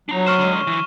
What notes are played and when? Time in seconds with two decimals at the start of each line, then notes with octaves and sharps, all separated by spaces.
0.09 F#3 D4 A#5
0.26 C5 F#5 C#6 F6 E7
0.39 D3 G#3
0.67 E3